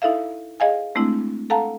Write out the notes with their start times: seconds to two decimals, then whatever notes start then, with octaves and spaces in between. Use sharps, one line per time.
0.02 D#4 E4 A4 E5 F5
0.60 G#4 D#5 F5 G#5
0.95 G#3 A3 C4 D4 E4
1.50 A4 F5 F#5 A5 A#5